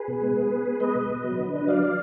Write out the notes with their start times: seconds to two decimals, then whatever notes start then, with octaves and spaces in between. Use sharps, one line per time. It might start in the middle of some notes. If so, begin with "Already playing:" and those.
Already playing: G#4 B4
0.08 B2
0.22 G#3
0.36 B3
0.51 B3
0.66 B3
0.80 G#3 B4 D#5
0.95 B2
1.10 B2
1.23 F#3
1.39 D3
1.54 D4
1.67 F#3 D5 F5
1.83 F#3